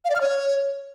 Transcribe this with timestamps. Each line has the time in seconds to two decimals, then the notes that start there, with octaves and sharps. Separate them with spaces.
0.05 F5
0.10 D5
0.15 F6
0.21 C#5